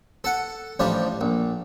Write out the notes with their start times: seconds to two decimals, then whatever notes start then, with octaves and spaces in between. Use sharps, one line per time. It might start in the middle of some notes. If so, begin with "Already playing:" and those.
0.24 A4 F#5
0.79 A1 F3 G3 D4
1.21 A#1